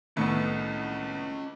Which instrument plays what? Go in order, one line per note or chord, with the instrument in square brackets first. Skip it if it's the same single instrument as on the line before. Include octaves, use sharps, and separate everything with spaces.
[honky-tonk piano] C2 B3 [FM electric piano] A2 D#3 [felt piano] A3 [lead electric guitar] C#4 D#5